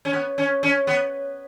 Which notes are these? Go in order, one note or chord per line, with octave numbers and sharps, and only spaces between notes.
C#4
B3
C#4
C#4
B3